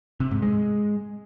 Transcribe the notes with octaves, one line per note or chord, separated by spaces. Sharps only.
C3
G#2
G#3